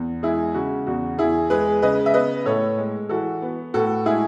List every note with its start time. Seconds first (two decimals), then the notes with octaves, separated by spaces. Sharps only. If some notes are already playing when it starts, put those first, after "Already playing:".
Already playing: E2
0.23 G#3 E4 G#4
0.54 C#3 F#4
0.87 E2 F#4
1.18 E2 E4 G#4
1.50 G#3 G#4 B4
1.82 C#3 B4 D#5
2.06 E5
2.14 B3 B4 D#5
2.46 A2 A4 C#5
2.77 G#3
3.09 E3 F#4 A4
3.42 B3
3.74 A2 F#4 A4
4.06 G#3 E4 G#4